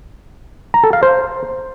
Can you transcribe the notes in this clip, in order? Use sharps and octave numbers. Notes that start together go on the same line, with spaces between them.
A#5
A4
F5
C5